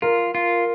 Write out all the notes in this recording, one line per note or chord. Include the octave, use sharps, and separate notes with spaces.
F4 A#4
F4